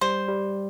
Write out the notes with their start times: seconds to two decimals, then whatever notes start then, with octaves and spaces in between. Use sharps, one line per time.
0.01 G3 C5
0.28 G3